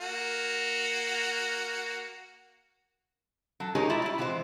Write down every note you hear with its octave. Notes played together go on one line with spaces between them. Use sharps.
A#3 F#4
F#3 A4
G#3 D#4 G4 G#4 A#4 C#5
E4 F4 D5 E5
G3 E4
C3 E3 G#3 F4 C5